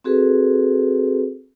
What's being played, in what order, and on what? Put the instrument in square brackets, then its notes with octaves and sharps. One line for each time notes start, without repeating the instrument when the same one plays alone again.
[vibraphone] C4 F#4 G#4 A4 B4